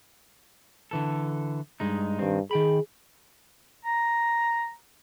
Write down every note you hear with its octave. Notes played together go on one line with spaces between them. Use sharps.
D3 E3 A4
G2 G#3 D#4
G2 D#3 C4
D#3 G#4 G5 B5
A#5